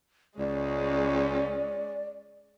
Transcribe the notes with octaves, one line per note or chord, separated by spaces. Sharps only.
C#2 G#3 C#4 D5